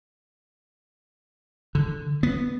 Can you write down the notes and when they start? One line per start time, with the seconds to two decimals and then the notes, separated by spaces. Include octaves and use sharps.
1.75 D3
2.23 B3